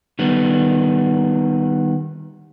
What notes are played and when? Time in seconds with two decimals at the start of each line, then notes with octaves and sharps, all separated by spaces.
0.19 D#3 G3 B3